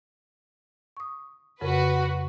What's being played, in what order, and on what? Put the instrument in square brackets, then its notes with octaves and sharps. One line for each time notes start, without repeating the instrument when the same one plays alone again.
[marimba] C#6 D#6
[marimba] F2 C#3 A#4 [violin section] F#4 B4